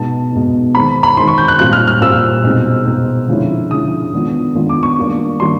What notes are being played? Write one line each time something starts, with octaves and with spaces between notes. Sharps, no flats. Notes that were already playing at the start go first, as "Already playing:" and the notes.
Already playing: B2 G#3 B3 D#4 A5
B2 G#3 B3 D#4
D#3 G#3 C4 D#4 B5
B5
D#3 G#3 C4 D#4 C6
C#6
G6
F#6
A#2 G3 C4 F4 F#6
F6
F6
A#2 G3 C4 F4 E6
B2 G#3 C4 D#4
B2 G#3 C4 D#4
D3 F3 G#3 C#4 E4
D3 F3 G#3 C#4 E4 D#6
D#3 G#3 B3 D4 F4
D#3 G#3 B3 D4 F4
D6
C#6
D#3 G3 A#3 D4
D#3 G3 A#3 D4 C6